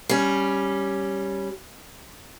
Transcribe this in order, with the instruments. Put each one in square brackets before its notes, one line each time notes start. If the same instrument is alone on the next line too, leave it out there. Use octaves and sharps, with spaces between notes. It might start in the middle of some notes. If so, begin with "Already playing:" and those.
[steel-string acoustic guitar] G3 C#4